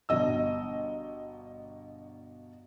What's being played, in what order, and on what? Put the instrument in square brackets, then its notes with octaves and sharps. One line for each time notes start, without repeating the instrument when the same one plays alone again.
[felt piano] G1 B2 D#5 E6